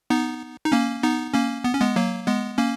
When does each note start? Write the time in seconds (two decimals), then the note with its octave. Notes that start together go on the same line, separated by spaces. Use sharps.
0.10 B3 D#4
0.65 D#4
0.72 A#3 C#4
1.03 B3 D#4
1.34 A#3 C#4
1.64 B3
1.74 C#4
1.81 G#3 B3
1.96 F#3 A#3
2.27 G#3 B3
2.58 A#3 C#4